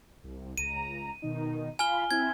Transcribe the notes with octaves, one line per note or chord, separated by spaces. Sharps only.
C2
C#2 A#5 D#7
B2 D#3 D#4
F4 F5 G#5 B5 F6 G7
C4 E4 E5 G#6